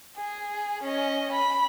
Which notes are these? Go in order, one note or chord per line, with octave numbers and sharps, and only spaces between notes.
G#4
C#4 D#5
B5